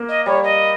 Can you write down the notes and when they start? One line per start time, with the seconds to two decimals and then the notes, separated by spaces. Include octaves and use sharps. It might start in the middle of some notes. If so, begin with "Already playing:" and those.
Already playing: A#3
0.09 D#5
0.26 G3 C#5
0.44 D#5